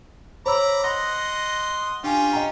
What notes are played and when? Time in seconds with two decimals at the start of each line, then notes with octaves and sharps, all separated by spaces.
0.46 C5 C#5 A#5 B5 D6 E6
0.84 D#5 F#5 C6 A#6
2.04 C#4 D4 F4 G4 G#5
2.33 D#5 G5 A#5